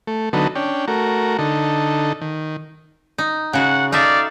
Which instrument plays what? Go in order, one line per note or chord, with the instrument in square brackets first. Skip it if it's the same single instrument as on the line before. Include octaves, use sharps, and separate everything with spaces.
[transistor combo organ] A3
D3 F#3 B3 D#4 A4
C#4 D4 G5
A3 F#4 A#4
D3 D#4 A4
D#3
[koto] D#4
[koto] C#3 F#4 [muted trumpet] F#5
[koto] D#4 A4 E5 [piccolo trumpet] D5 [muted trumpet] F5